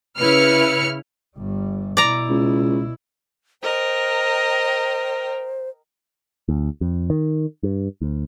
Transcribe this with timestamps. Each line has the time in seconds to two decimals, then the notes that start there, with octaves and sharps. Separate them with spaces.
0.18 C#3 E4 B4 F6 C#7
1.36 G1 G3
1.97 B2 E4 D5 A#5
2.29 C#2
3.62 A#4 C5 D#5 G5
6.49 D2
6.81 F2
7.10 D#3
7.63 G2
8.01 D2